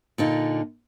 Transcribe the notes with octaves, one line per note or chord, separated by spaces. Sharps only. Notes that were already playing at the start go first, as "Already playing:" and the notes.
A#2 D3 D#4